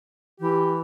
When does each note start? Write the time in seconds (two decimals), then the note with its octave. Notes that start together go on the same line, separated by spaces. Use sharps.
0.40 E3 G4